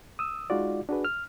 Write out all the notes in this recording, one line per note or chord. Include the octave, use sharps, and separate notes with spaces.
D#6 E6
G#3 D#4 F4 F#4 D5
D4 F#4 G#4 B4
F6